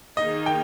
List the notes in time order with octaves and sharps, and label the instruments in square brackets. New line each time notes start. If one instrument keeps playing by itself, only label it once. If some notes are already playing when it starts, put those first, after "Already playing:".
[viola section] D#3 A#3 D#4 G#4 [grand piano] D#5
[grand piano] G5